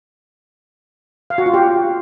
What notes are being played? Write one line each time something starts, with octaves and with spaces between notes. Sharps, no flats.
F5
F#4
F4
G4